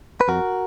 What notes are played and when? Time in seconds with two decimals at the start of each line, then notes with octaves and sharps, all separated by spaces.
0.21 B4
0.28 F2 F#4 A#4